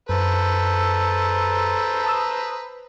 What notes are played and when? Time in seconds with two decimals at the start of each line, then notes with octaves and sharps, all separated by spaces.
0.09 F#2 A4 B4 C5 A#5
2.04 A5 D#6 E6